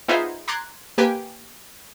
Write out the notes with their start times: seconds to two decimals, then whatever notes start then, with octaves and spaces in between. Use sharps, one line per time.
0.08 B3 D#4 F4 G#4 C5 E5
0.48 A#5 C6 D6 F#6 G#6 A6
0.98 A#3 G4 B4 G5 G#5